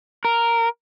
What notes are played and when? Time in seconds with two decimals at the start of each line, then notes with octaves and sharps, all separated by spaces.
0.25 A#4